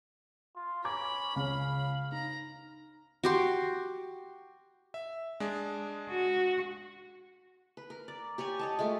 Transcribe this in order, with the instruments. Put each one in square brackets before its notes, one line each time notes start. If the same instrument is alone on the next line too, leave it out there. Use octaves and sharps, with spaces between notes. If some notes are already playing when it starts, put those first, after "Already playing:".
[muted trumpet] F4
[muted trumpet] C#4 [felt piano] A#5 D6 G#6 [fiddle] B5
[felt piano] C#2 C#3 C#5 [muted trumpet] F5
[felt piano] D#4 [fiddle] A#5
[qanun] F#4 G4 C6
[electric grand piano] E5
G#3 D4
[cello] F#4
[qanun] B4
A#4
D5
G4 C#5 D5 G#5
C#5 D#5 A5
G#3 A3 F4 G4